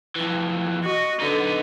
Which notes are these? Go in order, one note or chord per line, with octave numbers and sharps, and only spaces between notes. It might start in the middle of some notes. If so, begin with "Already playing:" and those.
F2 E3
F#4 D#5
D3 B3 D#4